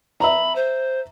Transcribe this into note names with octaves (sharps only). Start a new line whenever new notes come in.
E5 A#5 B5
C5